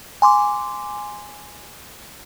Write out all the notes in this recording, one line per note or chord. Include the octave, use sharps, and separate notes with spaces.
G#5 C6 D6